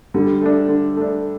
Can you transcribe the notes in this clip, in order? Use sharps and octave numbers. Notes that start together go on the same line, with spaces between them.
D3 G3
A3 D4
D3
A3 D4